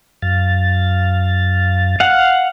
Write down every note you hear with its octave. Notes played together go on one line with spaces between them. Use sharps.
F#2 F5 A6
F5 F#5